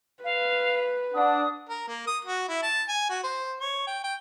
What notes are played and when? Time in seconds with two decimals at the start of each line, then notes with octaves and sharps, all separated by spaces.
0.24 B4 F5
1.15 D4 F#5 D#6
1.69 A#4
1.88 A#3
2.07 D#6
2.25 F#4
2.48 E4
2.63 A5
2.88 G#5
3.09 F#4
3.24 C5
3.60 C#5
3.87 G5
4.04 G5